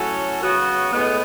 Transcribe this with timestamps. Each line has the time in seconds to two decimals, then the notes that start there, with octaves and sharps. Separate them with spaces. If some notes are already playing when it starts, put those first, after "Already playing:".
Already playing: A2 F#3 C#4 F#4 A4
0.41 C#3 F#3 B3 F#4
0.92 A2 G#3 B3